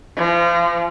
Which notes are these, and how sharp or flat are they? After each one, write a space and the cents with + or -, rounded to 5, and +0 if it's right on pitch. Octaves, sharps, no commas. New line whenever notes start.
F3 -30